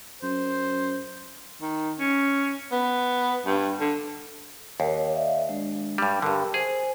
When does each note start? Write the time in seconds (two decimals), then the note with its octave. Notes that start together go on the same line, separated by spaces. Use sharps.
0.23 F#2 C5
1.61 D#3
1.99 C#4
2.72 B3
3.46 G2
3.80 D3
4.80 D#2 A#4 C#5
5.15 D5 E5 F5
5.49 G#3 D4
5.98 G2 G3
6.22 G2 D3 G4 A#4
6.54 G#4 C5 G#5